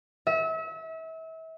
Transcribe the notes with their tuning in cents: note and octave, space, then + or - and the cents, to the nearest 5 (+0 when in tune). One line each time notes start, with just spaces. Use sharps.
E5 -35